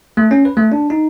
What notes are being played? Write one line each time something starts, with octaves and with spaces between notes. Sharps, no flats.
A3
C#4
B4
A3
D4
D#4